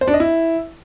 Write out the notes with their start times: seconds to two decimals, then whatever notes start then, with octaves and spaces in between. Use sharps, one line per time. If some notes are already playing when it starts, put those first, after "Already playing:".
0.01 C5
0.08 D4
0.14 D#5
0.20 E4